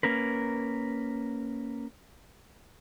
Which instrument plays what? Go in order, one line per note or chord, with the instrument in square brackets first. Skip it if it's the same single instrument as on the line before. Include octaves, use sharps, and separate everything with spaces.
[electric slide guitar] A#3 C#4 A#4 B4